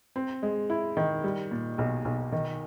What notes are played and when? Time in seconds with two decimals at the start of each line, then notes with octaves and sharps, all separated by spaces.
0.16 C4
0.43 G#3
0.70 E4
0.97 D#3
1.24 G3
1.51 A#2
1.78 B1
2.05 B1
2.32 D#3